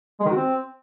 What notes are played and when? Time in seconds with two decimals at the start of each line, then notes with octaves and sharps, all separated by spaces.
0.20 G#3
0.25 D#3
0.31 F#4
0.37 C4